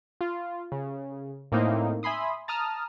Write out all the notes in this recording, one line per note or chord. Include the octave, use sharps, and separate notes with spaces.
F4
C#3
A2 A#3 C4 D#4 E4
E5 G#5 B5 C6 D#6
A5 A#5 D#6 F6